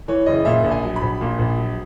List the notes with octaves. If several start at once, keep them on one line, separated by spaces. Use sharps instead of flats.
E3 C#5
F#1 D#5
A#2 E5
A#1
G#5
F#3
B5
A#1
A#2
A#1
F#3